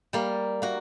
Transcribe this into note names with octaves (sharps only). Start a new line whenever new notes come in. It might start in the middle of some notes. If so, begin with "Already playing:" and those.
G3 A#3
A#3 F#4